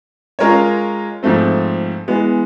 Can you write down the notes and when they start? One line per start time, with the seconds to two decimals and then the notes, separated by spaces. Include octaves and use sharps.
0.39 G#3 C#4 F4 A#4 C#5
1.23 G#2 F3 A3 C4
2.08 E3 G#3 B3